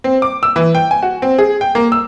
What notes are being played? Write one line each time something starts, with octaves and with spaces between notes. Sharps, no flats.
C4
D6
E6
E3
G5
G#5
F#4
C4
G#4
G5
A#3
E6